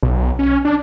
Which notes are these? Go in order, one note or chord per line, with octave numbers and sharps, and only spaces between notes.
B1
C#4
D4